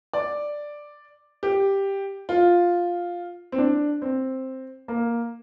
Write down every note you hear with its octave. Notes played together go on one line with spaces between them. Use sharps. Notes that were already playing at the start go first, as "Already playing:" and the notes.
D5
G4
F4
C4
D4
C4
A#3